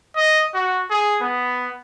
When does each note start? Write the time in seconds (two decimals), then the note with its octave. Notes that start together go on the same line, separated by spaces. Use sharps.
0.16 D#5
0.54 F#4
0.90 G#4
1.21 B3